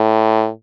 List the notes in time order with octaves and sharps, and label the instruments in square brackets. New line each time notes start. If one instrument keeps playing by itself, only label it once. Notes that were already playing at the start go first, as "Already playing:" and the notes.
Already playing: [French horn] A2